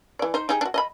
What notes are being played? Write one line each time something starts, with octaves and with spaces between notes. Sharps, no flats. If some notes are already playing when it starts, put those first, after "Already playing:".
E3 D5
D#4 C5
D#4 G4 G#4
D4 F#4
D#5 A5 B5